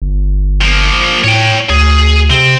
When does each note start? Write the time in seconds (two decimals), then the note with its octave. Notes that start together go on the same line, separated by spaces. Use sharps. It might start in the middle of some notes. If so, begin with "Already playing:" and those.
0.02 G1
0.62 F3 A#3
1.24 A2 C#5 G5
1.70 D2 G#4
2.30 C3 C4